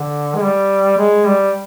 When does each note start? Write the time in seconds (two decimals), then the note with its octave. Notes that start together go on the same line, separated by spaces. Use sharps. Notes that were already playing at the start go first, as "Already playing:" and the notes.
Already playing: D3
0.35 G#3
0.43 G3
0.98 G#3
1.26 G3